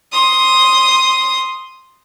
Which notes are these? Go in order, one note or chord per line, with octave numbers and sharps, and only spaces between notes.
C6 D#6